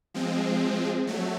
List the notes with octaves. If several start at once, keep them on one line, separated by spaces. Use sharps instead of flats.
F3 G#3 C4
F#3 A3